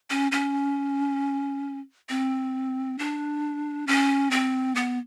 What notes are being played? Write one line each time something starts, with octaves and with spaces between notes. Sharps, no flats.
C#4
C#4
C4
D4
C#4
C4
B3